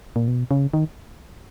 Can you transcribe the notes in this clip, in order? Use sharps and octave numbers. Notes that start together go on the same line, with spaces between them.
A#2
B2
C#3
D#3